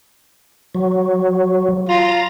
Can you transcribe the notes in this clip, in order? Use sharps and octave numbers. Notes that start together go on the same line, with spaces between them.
F#3
F4 A#5